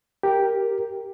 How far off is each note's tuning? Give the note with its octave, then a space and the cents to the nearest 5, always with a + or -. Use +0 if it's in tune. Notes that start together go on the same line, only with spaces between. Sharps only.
G4 +0 A#4 +0